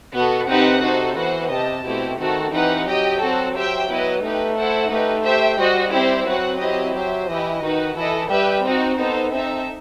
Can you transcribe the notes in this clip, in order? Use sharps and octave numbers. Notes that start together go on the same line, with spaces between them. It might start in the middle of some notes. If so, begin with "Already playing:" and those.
B2 B3 F#4 A4
C3 C4 D#4 G4 B4 F#5
D#4 F#4 A4 C5
E3 B3 F#4 C5 F#5
C3 G4 D#5 A5
B2 A3 C4 E4 G4
D#3 A3 C4 F#4 A4
E3 C4 D#4 G4 B4 F#5
F#3 G4 D#5 G5
C4 F#4 A4
G4 C5 E5 G5
B3 E4 B4 D#5
A3 D#4 G4 B4
E4 A4 C5 F#5
A3 D#4 G4 B4
G4 C5 E5 G5
G3 F#4 C5 D#5
C4 E4 G4 C5
F#3 C4 F#4 B4 F#5
C4 E4 G4 D#5
F#3 G4 C5 E5
E3 E4 G4 D#5
D#3 D#4 F#4 B4
E3 E4 A4 D#5
G3 G4 B4 E5 G5
C4 D#4 F#4
B3 D#4 A4 C5
C4 D#4 A4 E5